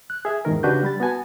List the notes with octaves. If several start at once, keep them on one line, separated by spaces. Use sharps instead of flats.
F#6
G#4 E5
E2 G#2 D#3 A#4
C#3 D4 F#4 G4 B4 G6
G3 B5 A6
B3 F#4 G#5 A5